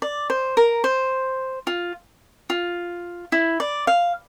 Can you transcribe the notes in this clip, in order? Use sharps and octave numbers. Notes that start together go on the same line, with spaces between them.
D5
C5
A#4
C5
F4
F4
E4
D5
F5